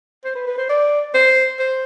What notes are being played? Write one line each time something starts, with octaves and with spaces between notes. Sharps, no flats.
C5
B4
B4
C5
D5
C5
C5